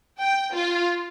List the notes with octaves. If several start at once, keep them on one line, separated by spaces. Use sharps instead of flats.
G5
F4